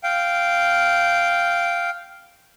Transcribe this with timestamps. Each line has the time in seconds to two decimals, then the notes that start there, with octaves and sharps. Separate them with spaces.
0.04 F5 G5